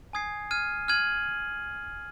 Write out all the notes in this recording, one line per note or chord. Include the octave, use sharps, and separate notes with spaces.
G#5 D#6 G#6 C7
F6 G#6 D#7
F6 G#6 D#7 F#7